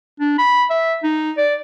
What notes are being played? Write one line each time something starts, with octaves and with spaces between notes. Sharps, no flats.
D4
B5
E5
D#4
D5